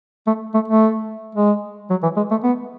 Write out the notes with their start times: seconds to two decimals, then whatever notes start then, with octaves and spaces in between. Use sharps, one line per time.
0.27 A3
0.54 A3
0.68 A3
1.35 G#3
1.90 F#3
2.02 E3
2.16 G#3
2.31 A3
2.43 B3